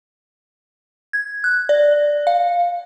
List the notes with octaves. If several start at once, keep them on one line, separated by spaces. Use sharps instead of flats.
G#6
F#6
D5
F5